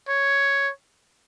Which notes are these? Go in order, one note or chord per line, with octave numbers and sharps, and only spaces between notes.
C#5